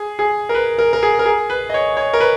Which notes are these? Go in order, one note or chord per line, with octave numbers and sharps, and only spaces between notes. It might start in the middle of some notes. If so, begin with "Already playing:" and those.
Already playing: G#4
G#4
A#4
B4
A#4
A#4
G#4
A#4
G#4
B4
D#5
C#5
C#5
A#4
B4